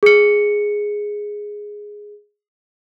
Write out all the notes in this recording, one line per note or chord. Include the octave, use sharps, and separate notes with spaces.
G#4 C#7